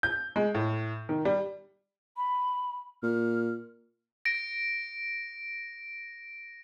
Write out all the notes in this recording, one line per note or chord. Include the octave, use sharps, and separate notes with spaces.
G6
G#3
A2
D#3
G3
B5
A#2 F6
A#6 D7